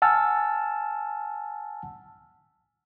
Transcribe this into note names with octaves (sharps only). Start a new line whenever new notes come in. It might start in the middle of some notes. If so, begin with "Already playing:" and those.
F#5 G#5 A5 E6 F6